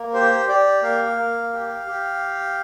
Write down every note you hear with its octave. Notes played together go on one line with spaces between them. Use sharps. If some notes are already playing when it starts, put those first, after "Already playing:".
Already playing: A#3
G4 C5
G4 D5
A#3 F5
A#3
G4
G4